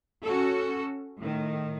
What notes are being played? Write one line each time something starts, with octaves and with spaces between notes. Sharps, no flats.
C#4 F#4 A4
A2 D#3